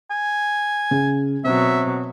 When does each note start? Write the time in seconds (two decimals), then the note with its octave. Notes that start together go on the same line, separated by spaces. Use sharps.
0.11 G#5
0.91 C#3
1.44 B2 F#3 C4 E5